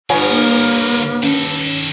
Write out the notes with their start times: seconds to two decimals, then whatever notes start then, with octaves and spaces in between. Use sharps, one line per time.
0.10 G2 D3 B3 F4 A#4 C#5 F#5 G#5
0.28 A#3
1.23 D#3 C#4 A4